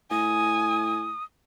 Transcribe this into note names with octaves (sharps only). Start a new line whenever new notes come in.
A2 G#5 D#6